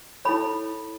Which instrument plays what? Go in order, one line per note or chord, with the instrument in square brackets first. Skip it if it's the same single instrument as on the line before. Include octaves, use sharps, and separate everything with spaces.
[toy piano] E4 A4 C#5 B5